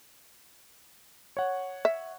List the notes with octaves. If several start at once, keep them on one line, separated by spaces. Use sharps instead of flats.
C#5 F#5
E5